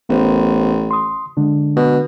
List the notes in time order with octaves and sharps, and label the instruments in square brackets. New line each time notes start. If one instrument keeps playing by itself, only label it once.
[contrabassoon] A1 [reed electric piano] B3 A#4 C5
[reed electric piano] C6 D#6
D3 G#3 D4
[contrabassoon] B2